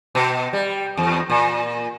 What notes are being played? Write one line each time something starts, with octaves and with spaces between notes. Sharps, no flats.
B2
G3
E2
A#2